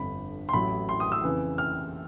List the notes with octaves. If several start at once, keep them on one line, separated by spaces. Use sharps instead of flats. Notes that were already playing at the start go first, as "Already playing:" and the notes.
Already playing: G1 F2 D3 B5
C6
A1 A2 F#3 B5
C6
D#6
E6
F2 C#3 E3
F6